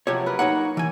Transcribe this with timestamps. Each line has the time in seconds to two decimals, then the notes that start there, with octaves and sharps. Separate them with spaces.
0.07 C3 F3 F#3 G4 C#5
0.26 F#3 A#4 B4
0.39 A#3 D#4 C#5 F#5
0.77 E3 G#5